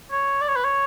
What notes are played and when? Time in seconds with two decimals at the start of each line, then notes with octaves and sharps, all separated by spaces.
0.11 C#5
0.41 D5
0.48 C#5
0.56 B4
0.65 C#5